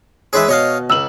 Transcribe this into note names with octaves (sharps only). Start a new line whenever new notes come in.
E3 G#3 G#4 B4 C#5 E5
B2 C#5 D#5 F5
C#2 E6 F#7